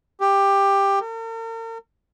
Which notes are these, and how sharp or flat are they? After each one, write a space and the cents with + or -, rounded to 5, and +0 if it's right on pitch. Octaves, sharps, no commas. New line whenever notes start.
G4 +15
A#4 -45